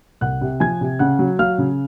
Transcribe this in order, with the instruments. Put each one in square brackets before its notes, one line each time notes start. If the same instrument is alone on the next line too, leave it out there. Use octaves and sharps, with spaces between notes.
[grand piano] C2 F#5 F#6
C3
F3 G#5 G#6
C3
C#3 F#5 F#6
F#3
F#3 F5 F6
C#3